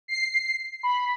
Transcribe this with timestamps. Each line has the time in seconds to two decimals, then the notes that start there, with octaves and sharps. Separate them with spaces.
0.08 C7
0.83 B5